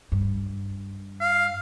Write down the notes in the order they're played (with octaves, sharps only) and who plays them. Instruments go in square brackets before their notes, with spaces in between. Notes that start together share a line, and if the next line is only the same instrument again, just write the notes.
[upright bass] G2
[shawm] F5